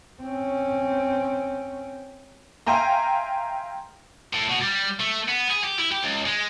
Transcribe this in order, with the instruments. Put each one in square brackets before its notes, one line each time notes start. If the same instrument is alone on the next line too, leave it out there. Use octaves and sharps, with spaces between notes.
[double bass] C4 C#4
[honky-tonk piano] E5 F5 G5 G#5 A#5 C6
[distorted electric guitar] A2
B2
G3
A3
B3
G#4
G4
E4
G4
C#2
G#3